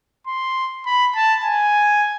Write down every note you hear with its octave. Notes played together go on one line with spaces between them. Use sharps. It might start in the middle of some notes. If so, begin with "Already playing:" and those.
C6
B5
A5
G#5